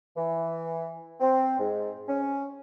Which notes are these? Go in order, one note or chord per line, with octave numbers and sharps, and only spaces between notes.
E3
C4
G#2
C#4